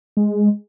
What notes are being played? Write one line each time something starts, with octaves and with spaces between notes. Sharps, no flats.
G#3